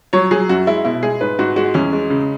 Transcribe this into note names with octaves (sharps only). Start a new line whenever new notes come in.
F#3 C#5
F#3 G#4
F#2 F#4
G#3 E4
B2 E4
G#3 G#4
G#2 B4
G#2 F#4
G#3 F#4
E2 C#4
G#3
C#3